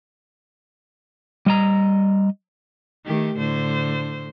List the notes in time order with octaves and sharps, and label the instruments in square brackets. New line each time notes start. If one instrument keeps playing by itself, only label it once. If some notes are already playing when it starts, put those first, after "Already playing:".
[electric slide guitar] G3 D#5 A#5
[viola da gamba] D#3 A3 G4
A2 D3 C5